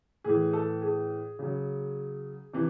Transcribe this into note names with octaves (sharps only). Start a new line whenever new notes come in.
A2 E3 G#4
A4
G#4
C#3 F#3
C3 E3